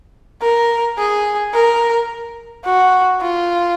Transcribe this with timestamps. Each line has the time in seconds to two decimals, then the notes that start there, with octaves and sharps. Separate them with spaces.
0.42 A#4
0.98 G#4
1.54 A#4
2.65 F#4
3.22 F4